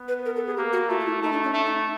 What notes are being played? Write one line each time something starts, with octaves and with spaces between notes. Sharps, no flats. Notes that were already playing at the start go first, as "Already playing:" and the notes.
Already playing: B3
B4
A#4
A4
G#4
A#3 G4
F#4
A3 F4
F4
E4
A3 D#4
D4
C#4
A3 D4
D#4